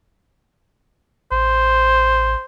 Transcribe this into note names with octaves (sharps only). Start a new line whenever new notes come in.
A1 C5